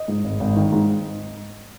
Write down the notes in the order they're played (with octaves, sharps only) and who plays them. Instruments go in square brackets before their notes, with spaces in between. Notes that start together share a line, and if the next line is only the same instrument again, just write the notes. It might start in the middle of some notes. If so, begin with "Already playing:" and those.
Already playing: [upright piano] D#5
G#2
G#1
G#1
D#3
G#2